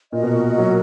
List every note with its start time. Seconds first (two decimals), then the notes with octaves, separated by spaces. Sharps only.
0.12 A#2 F#4 A#4 D#5
0.23 B2
0.33 A#2
0.58 F#3